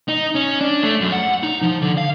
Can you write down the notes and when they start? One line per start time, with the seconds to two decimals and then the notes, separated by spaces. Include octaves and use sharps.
0.08 D#4
0.35 C#4
0.61 D4
0.83 A3
1.01 F#2
1.12 F#5
1.43 D#4
1.62 F3
1.82 D3
1.98 F5